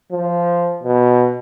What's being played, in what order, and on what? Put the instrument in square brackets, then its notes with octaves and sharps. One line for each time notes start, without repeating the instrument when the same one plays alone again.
[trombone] F3
B2